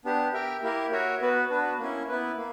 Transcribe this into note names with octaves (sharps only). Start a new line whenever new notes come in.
B3 D4 G4
G4 A#4 E5 G5
A#3 E4 G4 A#4
F#4 A#4 C#5 E5
B3 F#4 B4
B3 D4 F#4 B4
A#3 C#4 E4
B3 E4 B4
A#3